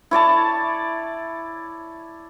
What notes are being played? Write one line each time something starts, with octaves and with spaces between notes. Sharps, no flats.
E4 C#5 D5 A5